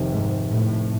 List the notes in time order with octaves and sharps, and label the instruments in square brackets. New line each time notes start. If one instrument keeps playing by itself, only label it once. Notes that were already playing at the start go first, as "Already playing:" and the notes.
Already playing: [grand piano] F1 F2 C3 D#3
[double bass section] G#2
A2